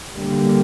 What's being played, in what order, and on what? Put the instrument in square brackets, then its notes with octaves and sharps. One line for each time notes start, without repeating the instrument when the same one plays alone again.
[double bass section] D3 G3 A#3